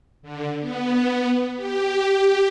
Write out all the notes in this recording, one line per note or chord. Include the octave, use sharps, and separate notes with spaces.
D3
B3
G4